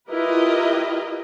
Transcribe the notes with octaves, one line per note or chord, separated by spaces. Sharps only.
E4 F4 G4 A#4 B4 D#5